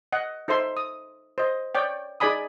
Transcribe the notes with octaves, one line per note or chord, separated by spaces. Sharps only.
D#5 F#5
D#4 A4 C5 E5 C6
D#6
C5 D#5
C#5 D5 G5
D#4 G#4 D5 G#5 B5 D#6